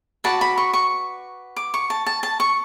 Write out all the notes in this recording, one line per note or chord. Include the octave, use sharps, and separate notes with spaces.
F#4 B4 D5 A5
B5
C#6
C#6
D6
C#6
A5
A5
A5
C#6